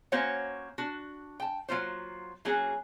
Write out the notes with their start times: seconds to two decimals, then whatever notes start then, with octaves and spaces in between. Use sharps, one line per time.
0.12 A#3 C#4 F#4 C5 C#5 F#5
0.78 D4 F#4
1.40 G5 A5
1.68 F#3 A#3 F4 C5
2.45 F#3 A#3 C#4 F#4 G#4